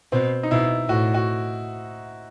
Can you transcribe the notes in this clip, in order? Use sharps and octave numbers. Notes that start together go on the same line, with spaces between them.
B2 C4
D#4
B2 E4
A2 F#4
F#4